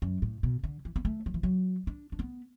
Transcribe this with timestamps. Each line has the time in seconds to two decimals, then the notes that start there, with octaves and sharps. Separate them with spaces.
0.02 F#2
0.22 A2
0.43 B2
0.64 D3
0.85 E3
0.96 B3
1.05 A3
1.26 F#3
1.34 E3
1.43 F#3
1.87 D4
2.12 D4
2.19 B3